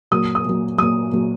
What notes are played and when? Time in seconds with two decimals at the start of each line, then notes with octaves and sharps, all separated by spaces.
0.11 A#2 F#3 D#6
0.35 D#6
0.45 A#2 F#3
0.78 A#2 F#3 D#6
1.12 A#2 F#3